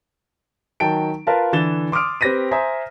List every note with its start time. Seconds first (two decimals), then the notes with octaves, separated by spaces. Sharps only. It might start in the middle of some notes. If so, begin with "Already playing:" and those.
0.80 D#3 F#3 G5 A5 D7
1.27 F4 A#4 B4 F5 A5
1.53 D3 E3 A6 E7 G7
1.92 C6 D6 D#6 F6 D7
2.21 C4 G4 B4 A#6 B6 D#7
2.51 C5 E5 G#5 A#5 D#6